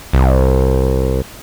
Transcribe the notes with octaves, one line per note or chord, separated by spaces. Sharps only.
C2